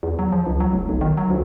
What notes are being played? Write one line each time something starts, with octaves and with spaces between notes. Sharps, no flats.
E2
F#3
F3
C#2
F#3
F1
B1
D#3
F#3
D2